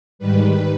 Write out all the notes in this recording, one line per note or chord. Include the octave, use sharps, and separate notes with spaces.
G#2 D#3 G3 B4